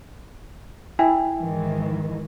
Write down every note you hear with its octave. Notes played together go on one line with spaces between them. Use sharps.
E4 E5 G5 G#5
G#2 D#3 E3